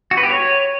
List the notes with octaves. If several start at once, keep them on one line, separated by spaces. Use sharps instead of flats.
F#4
B4
G4
C#5